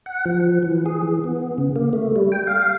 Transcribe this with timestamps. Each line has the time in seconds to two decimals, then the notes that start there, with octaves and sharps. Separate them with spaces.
0.06 F#5
0.25 F3
0.63 E3
0.86 G#4
1.03 E3
1.24 B3
1.58 C#3
1.76 A#3
1.93 A3
2.16 G3
2.32 G5
2.47 F5